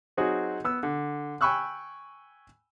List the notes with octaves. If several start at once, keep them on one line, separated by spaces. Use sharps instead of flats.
F#3 C4 D#4 F#4 G#4
B3 E6
D3
G5 G#5 B5 C#6 E6 F#6